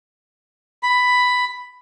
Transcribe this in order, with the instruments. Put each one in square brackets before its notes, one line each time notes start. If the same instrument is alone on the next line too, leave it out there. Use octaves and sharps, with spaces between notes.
[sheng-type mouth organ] B5